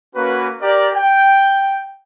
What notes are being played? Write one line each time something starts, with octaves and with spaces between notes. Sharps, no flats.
A#3 C#4 F#4 B4
G4 A#4 D5
G5